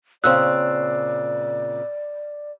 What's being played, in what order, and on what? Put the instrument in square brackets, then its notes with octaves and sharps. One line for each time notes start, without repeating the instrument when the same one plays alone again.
[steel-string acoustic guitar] A#2 C#3 C4 [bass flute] D5 [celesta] E6 F#6